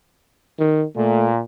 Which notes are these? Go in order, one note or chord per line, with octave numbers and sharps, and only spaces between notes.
D#3
A#2 A3